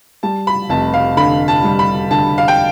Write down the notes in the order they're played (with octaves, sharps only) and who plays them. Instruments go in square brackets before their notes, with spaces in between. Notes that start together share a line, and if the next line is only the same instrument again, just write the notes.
[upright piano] G3 A5
B5
F1 A5
F5
D3 B5
A5
G3
B5
D3 A5
F5
G5